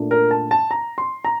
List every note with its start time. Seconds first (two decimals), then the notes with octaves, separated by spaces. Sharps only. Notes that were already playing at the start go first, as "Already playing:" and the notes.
Already playing: A#2 A3 D4
0.11 A#4
0.31 A5
0.51 A5
0.71 A#5
0.98 C6
1.25 A#5